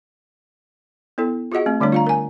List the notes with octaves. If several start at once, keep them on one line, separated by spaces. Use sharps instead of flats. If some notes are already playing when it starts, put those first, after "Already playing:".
B3 E4 A4
F4 F#4 G#4 D#5 F#5
A3 C4
D3 G3 A3 D4 C#5
F4 F5 A#5
A#4 G#5